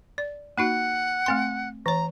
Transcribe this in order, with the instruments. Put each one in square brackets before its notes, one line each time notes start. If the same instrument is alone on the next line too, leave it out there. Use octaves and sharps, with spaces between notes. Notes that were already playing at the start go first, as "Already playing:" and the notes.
[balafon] D5
[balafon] A#3 D#4 F#4 [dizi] F#5
[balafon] A3 C4 C6
[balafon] E3 C#5 [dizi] A#5